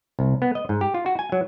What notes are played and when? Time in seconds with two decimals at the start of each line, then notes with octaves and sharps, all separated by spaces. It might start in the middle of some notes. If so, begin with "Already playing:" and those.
0.19 C2
0.42 B3
0.55 D#5
0.69 G#2
0.81 G4
0.94 F4
1.06 F#4
1.19 G#5
1.32 F#3